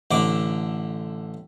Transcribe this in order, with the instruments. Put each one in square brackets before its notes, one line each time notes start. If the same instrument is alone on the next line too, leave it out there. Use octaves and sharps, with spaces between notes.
[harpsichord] A1 D3 D6